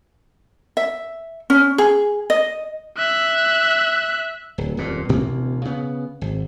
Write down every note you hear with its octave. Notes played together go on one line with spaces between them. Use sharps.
E5
C#4
G#4
D#5
E5 F#6
D1
D#1 F2 A#2
A1 D2 B2 A#3
C#3 B3
G#1